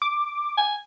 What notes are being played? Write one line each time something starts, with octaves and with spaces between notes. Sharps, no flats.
D6
G#5